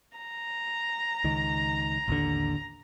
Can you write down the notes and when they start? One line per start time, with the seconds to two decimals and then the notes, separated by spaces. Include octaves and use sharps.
0.17 A#5
1.24 C#2 D#3
2.08 A1 D#2 D3